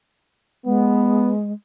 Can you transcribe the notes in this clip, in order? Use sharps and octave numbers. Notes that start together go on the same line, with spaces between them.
G#3 B3